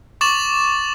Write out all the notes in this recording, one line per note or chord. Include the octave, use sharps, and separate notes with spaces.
C#6 D6 A6 E7 F#7